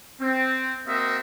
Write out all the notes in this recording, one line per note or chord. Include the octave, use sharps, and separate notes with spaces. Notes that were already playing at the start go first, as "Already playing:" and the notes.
C4
A#3 C4 F#4 D#5 E5